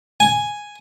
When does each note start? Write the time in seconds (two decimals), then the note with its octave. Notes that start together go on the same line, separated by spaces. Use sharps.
0.20 G#5